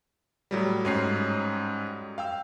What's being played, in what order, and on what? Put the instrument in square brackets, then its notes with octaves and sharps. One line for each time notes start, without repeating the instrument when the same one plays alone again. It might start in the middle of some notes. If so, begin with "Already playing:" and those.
[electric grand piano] A2 F#3 G3
[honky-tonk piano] G#2 C#4 C7
[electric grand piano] F5 G5 E6